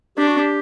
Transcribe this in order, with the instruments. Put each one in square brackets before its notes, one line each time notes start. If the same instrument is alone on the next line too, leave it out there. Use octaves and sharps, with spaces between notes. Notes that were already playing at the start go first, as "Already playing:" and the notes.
[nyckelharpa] D4 [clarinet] G4
[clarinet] F#4
G4